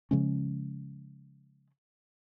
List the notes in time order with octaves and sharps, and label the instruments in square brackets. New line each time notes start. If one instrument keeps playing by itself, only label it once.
[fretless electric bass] C#3 F3 G#3 C#4